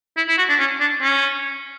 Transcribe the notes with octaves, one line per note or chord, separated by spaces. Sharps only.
E4
E4
F#4
D4
C#4
D4
C#4